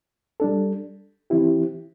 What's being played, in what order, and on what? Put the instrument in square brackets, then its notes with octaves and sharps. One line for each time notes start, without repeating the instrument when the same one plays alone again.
[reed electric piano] G3 D4 A4
E3 C4 E4 G4